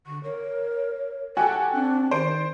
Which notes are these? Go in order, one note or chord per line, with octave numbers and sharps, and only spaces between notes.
D3 C#6
A#4 C#5
F#4 G4 A4 F#5 G#5
C4 D4
D#3 C5 D5 D7